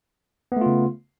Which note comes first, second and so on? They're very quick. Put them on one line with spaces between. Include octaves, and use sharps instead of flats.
B3 A3 F4 C#3